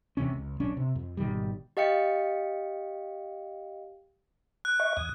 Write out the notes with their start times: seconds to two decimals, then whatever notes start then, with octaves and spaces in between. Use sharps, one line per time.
0.17 E1 E2 C3 C#4
0.33 C#2
0.60 D#1 B1 C#4 D4
0.77 C3
0.95 F2
1.17 G#1 B2 D#3 G3
1.77 G4 D#5 F5 G5 C#7
4.65 F#6
4.80 D#5 E5 C#6
4.97 E2 D#6 G#6